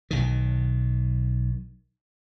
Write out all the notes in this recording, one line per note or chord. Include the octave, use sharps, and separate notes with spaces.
B1 D#3